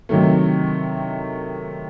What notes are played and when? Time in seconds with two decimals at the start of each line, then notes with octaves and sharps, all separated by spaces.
0.09 C3 D#3 F#3 A3